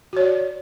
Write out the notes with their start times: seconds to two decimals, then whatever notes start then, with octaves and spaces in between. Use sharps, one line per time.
0.13 F#4
0.17 C#5
0.20 D5